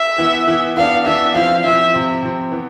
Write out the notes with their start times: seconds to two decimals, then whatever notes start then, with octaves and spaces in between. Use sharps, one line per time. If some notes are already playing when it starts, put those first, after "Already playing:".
Already playing: E5
0.18 E3 B3 E4
0.47 E3 B3 E4
0.77 E3 B3 D4 F5
1.06 E3 B3 D4 E5
1.34 F3 C4 E4 F5
1.64 F3 C4 E4 E5
1.94 C3 F3 C4
2.23 C3 F3 C4
2.51 E3 B3